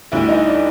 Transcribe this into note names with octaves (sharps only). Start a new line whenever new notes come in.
D2 D3 G3 E4
D#4
D4